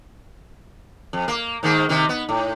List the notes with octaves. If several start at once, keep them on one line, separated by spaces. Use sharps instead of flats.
F2
A#3
G#2 D#3 A#3
C3 D#3
B3
A2